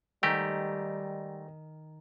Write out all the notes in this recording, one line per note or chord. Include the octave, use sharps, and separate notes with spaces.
G#2 D#3 G3 A3 G4 G5 A#6